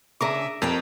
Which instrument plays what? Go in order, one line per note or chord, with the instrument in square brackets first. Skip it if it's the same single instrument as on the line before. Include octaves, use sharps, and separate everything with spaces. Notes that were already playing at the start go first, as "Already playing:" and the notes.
[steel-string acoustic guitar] C#3 D4 G#4 [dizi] E5 [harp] A#5 D6
[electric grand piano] F2 [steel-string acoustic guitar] G4 A#4 G5 [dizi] A5